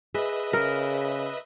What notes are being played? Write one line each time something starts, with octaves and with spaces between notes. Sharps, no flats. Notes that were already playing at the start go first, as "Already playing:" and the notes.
G#4 B4 D#5 E5
C#3 A#4